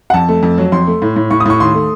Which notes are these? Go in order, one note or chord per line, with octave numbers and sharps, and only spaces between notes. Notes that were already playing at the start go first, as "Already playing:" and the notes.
F#5
F2 A5
A3
F2
F#3
F2 C6
A3
A2
A2
A2 C#6
D#6
A2 C#6
D#2 C6
A3